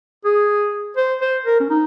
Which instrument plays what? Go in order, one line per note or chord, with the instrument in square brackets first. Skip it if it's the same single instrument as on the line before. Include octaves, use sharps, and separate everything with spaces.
[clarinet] G#4
C5
C5
A#4
C#4
D#4